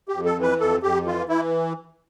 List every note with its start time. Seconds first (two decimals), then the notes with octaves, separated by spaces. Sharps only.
0.08 G4
0.13 F2
0.25 A4
0.37 E3
0.42 B4
0.60 F2 A4
0.83 F2 G4
1.06 E3 F4
1.29 E3 E4